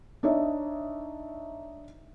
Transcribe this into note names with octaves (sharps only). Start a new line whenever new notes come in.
D4 D#4 C#5 D#5 E5